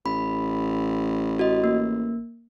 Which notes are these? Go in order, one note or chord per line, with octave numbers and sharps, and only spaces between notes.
A1 B5
F#4 D#5
A#3